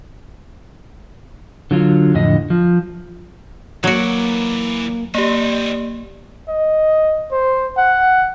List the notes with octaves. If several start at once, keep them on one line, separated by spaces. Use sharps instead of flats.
D3 F#3 F4
F2 A2 D3 D#5
F3
E3 F#3 A#3 F#4 D5
A#3 C4 D#4 G4 D5
D#5
C5
F#5